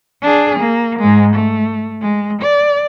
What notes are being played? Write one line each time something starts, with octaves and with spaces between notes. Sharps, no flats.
D4 G#4
A#3
G#2 G#3
A3
G#3
D5